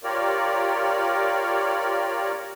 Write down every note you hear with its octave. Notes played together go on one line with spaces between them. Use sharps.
F4 G4 A#4 C#5 D5